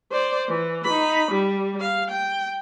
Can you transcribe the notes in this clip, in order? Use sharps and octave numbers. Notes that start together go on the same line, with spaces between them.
C5 D5
E3
D#4 B5
G3
F5
G5